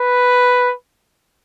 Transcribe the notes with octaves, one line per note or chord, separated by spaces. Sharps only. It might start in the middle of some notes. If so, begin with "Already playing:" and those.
Already playing: B4